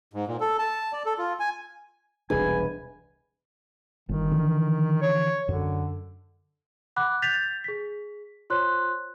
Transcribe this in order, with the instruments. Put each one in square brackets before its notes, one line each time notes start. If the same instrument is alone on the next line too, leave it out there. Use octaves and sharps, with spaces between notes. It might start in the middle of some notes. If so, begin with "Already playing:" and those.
[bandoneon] G#2
A#2
A4
A5
D5
A4
F4
G#5
[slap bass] E1 C2 D4 [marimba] G#4 [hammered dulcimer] B4 [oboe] G#5
[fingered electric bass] G1 [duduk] D#3
[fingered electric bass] D3 E3 F3
[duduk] C#5
[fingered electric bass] F#2 [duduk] D3
[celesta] F#5 B5 D6 F#6
G6 A6 B6 F7
G#4 B6
F4 C5 C#5 C6 F#6